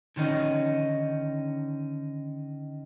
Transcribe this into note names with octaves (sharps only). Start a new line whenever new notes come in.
D3 D#3 C#4 D#4